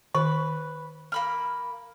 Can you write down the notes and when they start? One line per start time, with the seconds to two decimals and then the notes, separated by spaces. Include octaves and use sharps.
0.15 D#3 B4
1.12 A#3 B5 F6